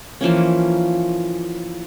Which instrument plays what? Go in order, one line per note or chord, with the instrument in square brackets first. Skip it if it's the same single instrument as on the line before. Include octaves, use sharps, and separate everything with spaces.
[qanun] E3 F3 A#3 C#4